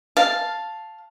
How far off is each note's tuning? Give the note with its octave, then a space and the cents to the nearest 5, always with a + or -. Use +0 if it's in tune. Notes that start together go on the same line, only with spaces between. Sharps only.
F5 +0 A5 +0